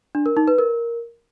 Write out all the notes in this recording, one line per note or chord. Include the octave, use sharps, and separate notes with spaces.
D4
A#4
D#4
B4
A#4